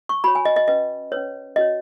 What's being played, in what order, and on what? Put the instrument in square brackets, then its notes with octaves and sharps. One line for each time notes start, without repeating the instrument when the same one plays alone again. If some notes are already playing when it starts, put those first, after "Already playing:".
[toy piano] C#6
F#4 C#5 B5
G#5
D#5
D#5
C#4 B4 D#5
C#4 B4 C#5
C#4 F#4 C#5 D#5